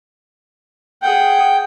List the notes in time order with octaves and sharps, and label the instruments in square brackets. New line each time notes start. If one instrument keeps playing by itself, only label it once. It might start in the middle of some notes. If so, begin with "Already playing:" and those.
[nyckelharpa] G#4 F#5 [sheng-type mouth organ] G5